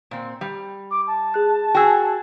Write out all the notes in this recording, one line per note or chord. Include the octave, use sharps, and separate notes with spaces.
A#2 C4
G3
D6
A5
G#4 F#6
F#4 G#4 G5 G#5 E6